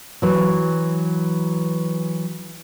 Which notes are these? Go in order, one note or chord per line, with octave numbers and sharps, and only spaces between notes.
E3 F#3